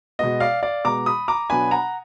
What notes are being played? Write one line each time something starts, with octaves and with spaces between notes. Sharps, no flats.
B2 G#3 B3 D#5
D5 F5
D5 F5
B2 G#3 B3 A#5 D6
B5 D#6
A#5 D6
B2 F#3 B3 D4 G#5 B5
F#5 A#5